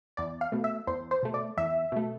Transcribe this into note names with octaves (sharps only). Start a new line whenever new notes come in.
E2 D5
F5
B2 A3
E5
E2 C5
C5
B2 A3
D5
E2 E5
B2 A3